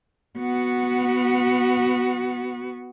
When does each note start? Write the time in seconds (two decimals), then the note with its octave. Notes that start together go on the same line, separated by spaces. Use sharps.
0.38 B3 F#4